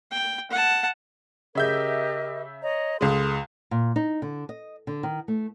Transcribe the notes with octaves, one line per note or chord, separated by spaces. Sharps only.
G5
F#5 A5
C#3 G4 A#4 D#5 E5 G6
C#5 D#5 A#5
C#2 G#3 A4 C6 D#6
A#2
D#4
D3
D#5
D3
D#3
A3